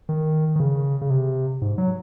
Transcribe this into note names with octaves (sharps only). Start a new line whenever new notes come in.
D#3
D#3
C#3
C#3
C3
G#2
F#3